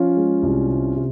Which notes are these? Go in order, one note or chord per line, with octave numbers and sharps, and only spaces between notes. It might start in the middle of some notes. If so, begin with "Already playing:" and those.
Already playing: F3 C#4 F4
G#3
C2
C3
C3